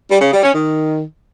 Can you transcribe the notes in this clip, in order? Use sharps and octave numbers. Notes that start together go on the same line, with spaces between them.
G3
C#3
G3
C#4
D#3